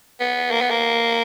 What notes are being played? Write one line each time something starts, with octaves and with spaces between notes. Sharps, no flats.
B3
A#3
B3
A#3